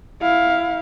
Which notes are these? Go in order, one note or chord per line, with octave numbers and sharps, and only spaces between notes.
E4 F5